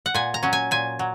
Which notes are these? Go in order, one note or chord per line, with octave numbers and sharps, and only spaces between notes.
F#5
A#2 G#5
A#5
F#3 C#4
G#5
A#2 G#5
F#3